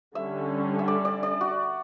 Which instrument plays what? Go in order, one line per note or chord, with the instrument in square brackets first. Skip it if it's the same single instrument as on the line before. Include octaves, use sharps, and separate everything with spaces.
[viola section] D3 G3 C#4 [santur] E5
[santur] E5
D5
D5
D5
F#4